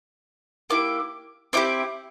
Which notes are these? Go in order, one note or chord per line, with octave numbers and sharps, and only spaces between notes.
A#3 E4 G4 D6
C4 E4 G4 D6